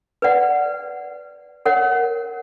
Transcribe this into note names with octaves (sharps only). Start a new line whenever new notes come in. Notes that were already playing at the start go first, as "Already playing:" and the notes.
B4 D5 F#5
A#4 C#5 F#5